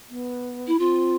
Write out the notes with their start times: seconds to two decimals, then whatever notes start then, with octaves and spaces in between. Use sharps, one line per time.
0.10 B3
0.67 E4
0.79 C4 F4